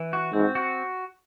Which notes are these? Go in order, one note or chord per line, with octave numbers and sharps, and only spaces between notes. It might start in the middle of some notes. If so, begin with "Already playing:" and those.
Already playing: E3
F#4
G#2 C4
F#4